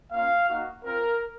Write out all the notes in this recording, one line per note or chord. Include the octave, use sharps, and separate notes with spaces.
A#3 C#4 F4 F5
A#3 D#4 F#4
C4 F4 A#4